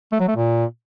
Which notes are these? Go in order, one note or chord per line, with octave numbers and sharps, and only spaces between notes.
A3
F#3
A3
A#2